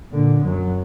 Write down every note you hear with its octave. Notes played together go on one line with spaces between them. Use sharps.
A#2 D3
F#2 F#3